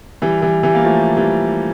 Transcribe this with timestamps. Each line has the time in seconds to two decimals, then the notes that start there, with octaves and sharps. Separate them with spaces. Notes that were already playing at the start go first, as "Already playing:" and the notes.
0.22 E3 G3
0.42 E3 G3
0.63 E3 G3
0.75 A#3
0.84 F3 A3
1.17 E3 G3